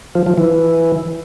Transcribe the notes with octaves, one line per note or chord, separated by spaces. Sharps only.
F3
F3
E3